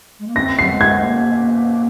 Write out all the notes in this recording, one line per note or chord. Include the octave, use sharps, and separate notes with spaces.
G#3
A#3
C#4 A#6
C4
C7
F#3
G#3
G#6
A#3